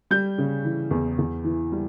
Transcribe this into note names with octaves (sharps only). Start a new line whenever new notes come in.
G3 G6
C#3
E3
E2
E2
E3
G3